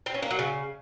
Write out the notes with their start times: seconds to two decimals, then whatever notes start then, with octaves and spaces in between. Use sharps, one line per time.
0.06 C4
0.14 C#4
0.22 A#3
0.31 F#3
0.39 C#3